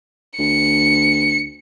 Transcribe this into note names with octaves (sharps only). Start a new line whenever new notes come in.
D2 C#7